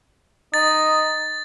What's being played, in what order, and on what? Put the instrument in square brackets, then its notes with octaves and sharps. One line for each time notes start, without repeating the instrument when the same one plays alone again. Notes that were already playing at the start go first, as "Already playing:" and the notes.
[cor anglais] D#4 [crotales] A6